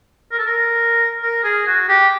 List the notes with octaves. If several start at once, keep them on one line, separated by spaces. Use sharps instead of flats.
A#4
A4
A#4
A#4
G#4
F#4
G4